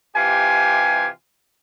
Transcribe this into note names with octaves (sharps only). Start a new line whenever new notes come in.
C3 E3 F4 G4 G#5